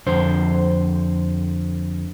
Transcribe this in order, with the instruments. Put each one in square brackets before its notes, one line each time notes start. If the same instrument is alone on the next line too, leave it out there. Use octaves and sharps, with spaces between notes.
[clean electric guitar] F2 D3 C5